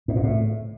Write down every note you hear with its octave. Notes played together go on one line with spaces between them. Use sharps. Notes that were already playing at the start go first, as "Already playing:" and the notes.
G#2
A#2
A2